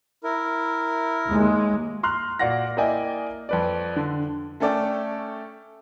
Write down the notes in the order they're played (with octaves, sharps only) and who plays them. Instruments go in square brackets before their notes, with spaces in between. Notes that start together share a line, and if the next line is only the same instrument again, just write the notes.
[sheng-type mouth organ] E4 A#4
[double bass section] D#2 G#3
[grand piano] A#5 C6 F6 F#6
A#2 F#4 D5 F5 F#5 A#6
A#3 E4 D5 D#5 G5 G#5
F2 B4 D5
D3
A3 C#4 A4 D5 G5